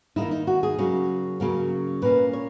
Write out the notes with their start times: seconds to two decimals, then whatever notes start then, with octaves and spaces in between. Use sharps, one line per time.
0.16 D#3 A#3 D#4 E4
0.31 D#4
0.47 F#4
0.63 G#4
0.78 C#3 F#3 A#3 C#4
1.40 C#3 F#3 A#3 C#4
2.02 A#2 A#3 C#4 B4
2.33 C#5